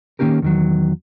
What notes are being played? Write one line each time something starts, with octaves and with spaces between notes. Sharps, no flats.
D#3 F#3 A#3 C#4 G4 A#4
E2 D#3 F#3